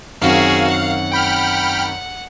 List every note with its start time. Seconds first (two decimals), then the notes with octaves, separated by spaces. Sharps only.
0.21 F#2 D#3 C4 F#4 G#4 F5
0.70 F#5
1.12 G5 B5 F6